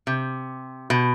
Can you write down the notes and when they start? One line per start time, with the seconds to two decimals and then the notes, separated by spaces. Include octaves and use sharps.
0.07 C3
0.90 B2